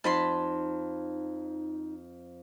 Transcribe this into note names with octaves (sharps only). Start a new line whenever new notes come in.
F2 D#4 A5 B5 C6